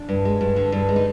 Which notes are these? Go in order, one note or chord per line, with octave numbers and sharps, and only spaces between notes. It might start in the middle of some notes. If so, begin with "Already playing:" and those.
Already playing: D4
G2
G#3
G2
D3
G2
G#3
D#4